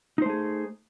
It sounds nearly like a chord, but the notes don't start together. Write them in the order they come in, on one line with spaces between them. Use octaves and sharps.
D#4 C5 A3 G#4